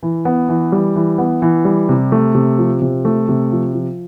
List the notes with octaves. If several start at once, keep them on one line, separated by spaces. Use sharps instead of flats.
E3
B3
E3
G3
E3
B3
E3
G3
C3
A3
C3
F3
C3
A3
C3
F3
F3